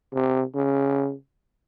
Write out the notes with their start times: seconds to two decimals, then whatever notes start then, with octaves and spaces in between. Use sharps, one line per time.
0.13 C3
0.55 C#3